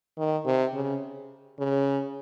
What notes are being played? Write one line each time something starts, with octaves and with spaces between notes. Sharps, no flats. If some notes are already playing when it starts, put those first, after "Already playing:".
D#3
C3
C#3
C#3